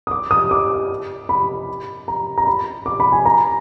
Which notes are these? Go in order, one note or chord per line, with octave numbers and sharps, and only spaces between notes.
D#6
D6
D#6
D6
B5
A#5
A#5
B5
D6
B5
G#5
A#5